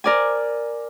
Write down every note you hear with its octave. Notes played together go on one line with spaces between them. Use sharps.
A#4 D5 G#5